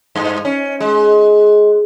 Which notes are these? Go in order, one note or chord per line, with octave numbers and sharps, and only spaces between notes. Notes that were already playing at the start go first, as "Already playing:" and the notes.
G2
C#4
G#3